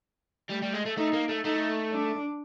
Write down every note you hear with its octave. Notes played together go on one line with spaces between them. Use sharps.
G3 A3
G3
G#3
A3
A3 D#4
A#3
A3
A3 D#4
D4